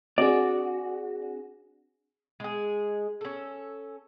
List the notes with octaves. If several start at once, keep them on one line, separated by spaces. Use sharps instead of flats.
C4 D4 F#4 G#4 D5
G#3 G#4
C#4 A4